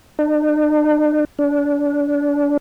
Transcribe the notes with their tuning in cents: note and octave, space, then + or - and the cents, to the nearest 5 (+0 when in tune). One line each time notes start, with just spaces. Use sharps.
D4 +45
D4 -30